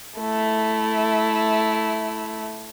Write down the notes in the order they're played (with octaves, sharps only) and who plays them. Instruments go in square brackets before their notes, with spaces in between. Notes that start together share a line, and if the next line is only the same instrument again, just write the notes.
[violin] A3 E4